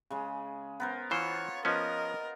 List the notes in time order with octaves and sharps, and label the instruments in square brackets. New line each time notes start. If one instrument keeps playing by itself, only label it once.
[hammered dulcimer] C#3 G#3
B3 A#4 C5
[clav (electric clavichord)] E3 C5 [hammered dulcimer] F4 [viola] C#5
[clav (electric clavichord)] F3 B3 C#4 [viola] A#4 [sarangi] D#5